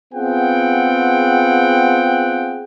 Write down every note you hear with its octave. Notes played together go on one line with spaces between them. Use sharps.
B3 C4 F4 G#4 F#5 G5